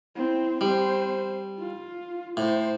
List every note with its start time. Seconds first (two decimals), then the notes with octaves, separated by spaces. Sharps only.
0.15 C4 E4
0.61 G3 C4 C5
1.59 F4
2.37 A2 C5